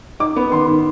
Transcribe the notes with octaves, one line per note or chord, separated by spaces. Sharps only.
D#4 D6
B3
D#3 C6
D#3